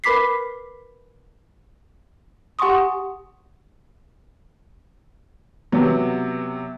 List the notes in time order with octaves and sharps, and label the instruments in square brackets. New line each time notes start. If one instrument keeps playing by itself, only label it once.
[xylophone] A#4 B4 B5 D6 B6 C7
G4 F#5 G#5 C6 C#6 D#6
[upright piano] C3 F#3 [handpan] B3